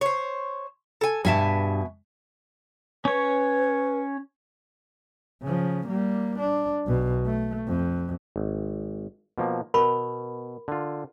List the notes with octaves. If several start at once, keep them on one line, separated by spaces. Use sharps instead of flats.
C5 C#5
A4 G#5
G2 B2 A4 E5 G#5 A5
C#4 B4 C#5
C#3 F3
G3 A#3
D4
B1 B2
A3
F2
G#1
B2 F3 A#3
B2 A#4 B5 C#6
D3 F4